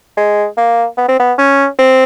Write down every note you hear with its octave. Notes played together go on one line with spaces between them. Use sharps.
G#3
A#3
B3
C4
B3
C#4
C4